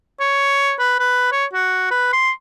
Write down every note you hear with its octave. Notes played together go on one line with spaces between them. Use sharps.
C#5
B4
B4
C#5
F#4
B4
C6